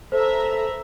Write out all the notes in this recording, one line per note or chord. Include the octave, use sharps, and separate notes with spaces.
A4 B4 C5 E5 A#5